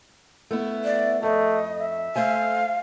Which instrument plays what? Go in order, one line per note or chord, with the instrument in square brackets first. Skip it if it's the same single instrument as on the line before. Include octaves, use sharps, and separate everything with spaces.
[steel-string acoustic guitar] A3 B3 E4
[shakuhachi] D5
[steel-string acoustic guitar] F2 [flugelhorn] A3 [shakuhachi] D#5
[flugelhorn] E5
[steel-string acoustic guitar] A3 C5 G#5 [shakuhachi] F5